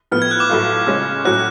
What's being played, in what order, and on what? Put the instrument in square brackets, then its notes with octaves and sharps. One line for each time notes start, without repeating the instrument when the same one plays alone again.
[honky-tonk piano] A2 F3 B3 [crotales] F6
[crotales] G#6
F#6
D6
[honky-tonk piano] A2 F#3 A3 F4
C#3 G#3 C#4
[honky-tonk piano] A2 F#3 C#4 F#4 [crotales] F#6